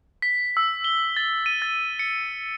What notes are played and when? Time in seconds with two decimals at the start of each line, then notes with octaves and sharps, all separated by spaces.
0.22 B6
0.57 E6
0.84 G7
1.17 A6
1.46 D#7
1.62 A6
1.99 C#7